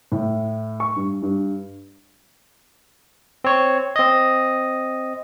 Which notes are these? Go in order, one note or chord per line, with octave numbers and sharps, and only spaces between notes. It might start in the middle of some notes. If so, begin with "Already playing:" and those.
A2
C#6
G2
G2
C4 C#5
C4 D#5